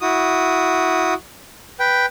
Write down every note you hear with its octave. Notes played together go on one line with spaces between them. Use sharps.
E4 F#4 D#6
B4 G5